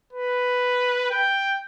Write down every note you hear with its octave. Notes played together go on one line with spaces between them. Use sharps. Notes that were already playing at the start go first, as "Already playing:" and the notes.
B4
G5